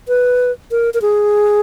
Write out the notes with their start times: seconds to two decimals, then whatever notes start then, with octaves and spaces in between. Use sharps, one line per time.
0.08 B4
0.71 A#4
0.94 A#4
1.02 G#4